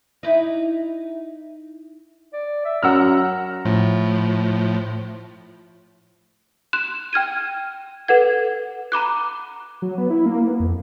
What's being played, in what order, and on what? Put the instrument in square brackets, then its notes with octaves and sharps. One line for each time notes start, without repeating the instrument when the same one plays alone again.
[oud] D#4 E4
[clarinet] D5
E5
[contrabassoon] F#2 [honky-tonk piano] F#5 E6 F6 [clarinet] A#5
[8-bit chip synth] A2 F3
[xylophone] C6 F#6 E7
G5 F6 G#6 D#7
A4 B4 F#5 G#6
A#5 B5 D6 F#6
[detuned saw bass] F#3
B3
E4
A#3
B3
F2